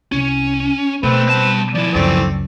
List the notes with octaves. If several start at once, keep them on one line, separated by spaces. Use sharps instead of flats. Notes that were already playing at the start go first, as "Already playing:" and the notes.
C2 C#4
B2 A3 C4 B4
G3 A5
F3 E4 D5
C#2 F#2 A3 C4 D5